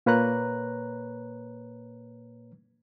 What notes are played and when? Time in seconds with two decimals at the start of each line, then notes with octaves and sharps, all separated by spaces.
0.06 A#2 A#3 B4 C#5 A#5 F#6